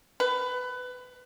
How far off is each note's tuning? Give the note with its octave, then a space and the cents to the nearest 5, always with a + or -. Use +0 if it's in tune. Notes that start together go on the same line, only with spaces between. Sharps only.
B4 +20